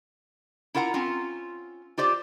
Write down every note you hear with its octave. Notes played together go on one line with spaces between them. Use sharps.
E4 F4 A#4 F#5 A#5
C4 C#4 F4
F4 G4 C5 D5